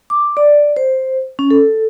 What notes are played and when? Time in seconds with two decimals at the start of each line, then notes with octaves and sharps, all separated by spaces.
0.10 D6
0.37 D5
0.77 C5
1.39 C#4
1.51 A4